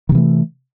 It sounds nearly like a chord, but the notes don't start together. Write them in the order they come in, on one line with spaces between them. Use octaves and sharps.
D#3 C3 E3 A3